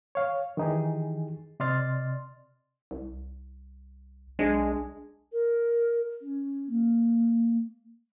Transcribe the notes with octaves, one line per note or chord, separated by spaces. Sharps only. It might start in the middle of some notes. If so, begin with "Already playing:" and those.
C#5 F5
D#3 E3 D#4 G4 G#4
C3 D5 D#5 C6 F6 A6
C2
B1 G#3 D4 G#4
A#4
C#4
A#3